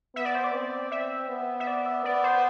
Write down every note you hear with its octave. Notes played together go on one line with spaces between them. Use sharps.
B3 E5
D5
C5
D5
C4
E5
B3
E5
D5
E5
B3 D5
C5